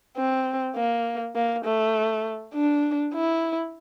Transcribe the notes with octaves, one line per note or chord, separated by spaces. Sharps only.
C4
A#3
A#3
A3
D4
E4